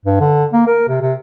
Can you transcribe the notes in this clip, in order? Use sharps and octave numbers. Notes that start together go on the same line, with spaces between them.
G2
D3
A#3
A#4
C3
C3